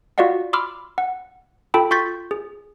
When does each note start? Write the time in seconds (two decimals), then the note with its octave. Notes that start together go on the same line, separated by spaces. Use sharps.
0.18 F4 F#4 D5 D#5 F5 F#5
0.53 B5 C6 D6 E6 F6
0.98 F#5
1.74 F4 A4 G5 A5 B5
1.91 F4 C6 C#6 G6 A6 B6
2.31 G#4